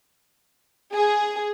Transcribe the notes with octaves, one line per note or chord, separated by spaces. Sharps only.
G#4